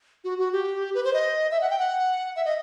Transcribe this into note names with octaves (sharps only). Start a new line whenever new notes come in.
F#4
F#4
G4
B4
C5
D#5
E5
F#5
G5
F#5
E5
D#5